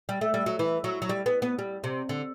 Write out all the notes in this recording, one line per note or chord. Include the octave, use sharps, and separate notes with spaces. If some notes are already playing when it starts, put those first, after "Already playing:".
G3
A3
G3
F#3
E3
F#3
F#3
G3
B3
B3
G3
C3
D3